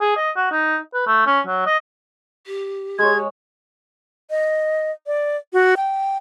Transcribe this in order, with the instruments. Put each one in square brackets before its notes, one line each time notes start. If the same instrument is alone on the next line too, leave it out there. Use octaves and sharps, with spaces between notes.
[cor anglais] G#4
D#5
F#4
D#4
B4
A3
C#4
F#3
D#5
[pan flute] G4
[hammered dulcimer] G#3 C#5 [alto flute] G#4 [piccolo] G#6
[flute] D#5
D5
F#4
G5